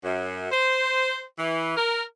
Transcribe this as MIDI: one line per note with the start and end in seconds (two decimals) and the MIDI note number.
0.04 0.47 42
0.52 1.24 72
1.39 1.75 52
1.77 2.01 70